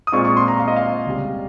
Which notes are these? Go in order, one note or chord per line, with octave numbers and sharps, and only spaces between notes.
D#6
A#2 G#3 C4 F4 C#6
C#6
C6
A#5
F5
D#5
F5
C#2 C3 G3